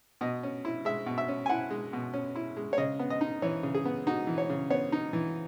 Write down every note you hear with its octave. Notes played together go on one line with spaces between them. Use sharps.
B2 D#5
C#4
E4
G#3 E5
B2
E5
C#4
G#5
E4 F#5
G#3
B2
C#4
E4
G#3
C#5
C#3 D#5
B3
D#5
D#4
E3 C#5
C#3
G#4
B3
D#4 F#4
E3
C#5
C#3
B3 C#5
D#4
E3